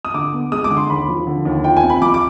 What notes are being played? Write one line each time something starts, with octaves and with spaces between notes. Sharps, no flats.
D#6
D3 D6
B3
G#3 D#6
D6
D3
C6
D#2 B5
F3
D3
D#2
F4 G5
G#5
C4
B5
F3 D6
D6